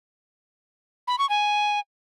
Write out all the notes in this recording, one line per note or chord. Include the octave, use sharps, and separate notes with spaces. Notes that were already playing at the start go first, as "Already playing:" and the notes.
B5
C#6
G#5